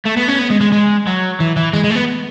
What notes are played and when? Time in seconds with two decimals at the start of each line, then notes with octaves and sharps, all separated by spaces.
0.05 A3
0.17 B3
0.28 C#4
0.39 B3
0.50 G#3
0.61 G#3
0.72 G#3
1.07 F#3
1.40 E3
1.57 E3
1.73 G#3
1.84 G#3
1.90 A3
1.95 B3